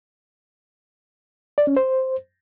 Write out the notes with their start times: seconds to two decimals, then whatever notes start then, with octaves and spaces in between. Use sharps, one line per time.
1.58 D5
1.67 C#4
1.77 C5